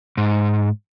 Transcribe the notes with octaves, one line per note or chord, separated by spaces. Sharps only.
G#2